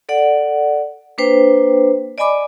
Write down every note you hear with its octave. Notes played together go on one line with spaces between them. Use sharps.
A4 D5 F#5
A#3 D4 B4 C5 G5
D5 D#5 G#5 B5 D6